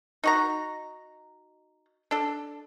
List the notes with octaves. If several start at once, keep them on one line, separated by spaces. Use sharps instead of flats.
D#4 F#4 A#5
D4 A4